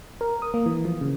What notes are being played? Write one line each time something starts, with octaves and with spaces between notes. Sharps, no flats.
A#4
D#6
A#3
E3
F3
C#3